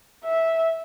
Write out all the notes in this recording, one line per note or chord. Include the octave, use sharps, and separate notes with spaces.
E5